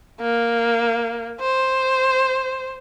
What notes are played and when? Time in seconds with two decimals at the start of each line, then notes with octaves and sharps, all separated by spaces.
0.21 A#3
1.41 C5